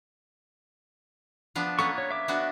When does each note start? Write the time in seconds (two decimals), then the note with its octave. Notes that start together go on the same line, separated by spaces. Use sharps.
1.55 F3 B3 D4
1.79 A#3 B3 C#4 A4 C#6
1.98 C#5
2.11 E5 D6
2.28 B3 D4 F#4